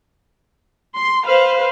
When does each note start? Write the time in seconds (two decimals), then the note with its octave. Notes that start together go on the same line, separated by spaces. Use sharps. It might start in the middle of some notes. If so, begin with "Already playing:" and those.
0.95 C6
1.27 B4 C5 F5